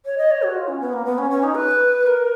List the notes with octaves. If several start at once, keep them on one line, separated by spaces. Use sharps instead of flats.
C#5
D#5
C#5
F#4
F4
C#4
B3
A#3
B3
C#4
C#4
D#4
B4
A#4